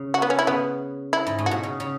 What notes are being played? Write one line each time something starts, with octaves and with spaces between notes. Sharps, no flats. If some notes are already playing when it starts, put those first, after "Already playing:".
Already playing: C#3
F#4
B3
C#4
E4
C#3 B3
E4
G#2
A2
F#4
B2
C#3
C#3